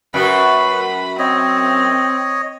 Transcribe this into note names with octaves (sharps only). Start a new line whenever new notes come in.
F#2 F#4 B4 B5
C4 C#5 D#5